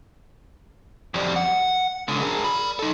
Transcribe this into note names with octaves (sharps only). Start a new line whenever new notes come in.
F2 G3
F#5
C#2 D3
G#4 A#4
D5 B5
D#4 A4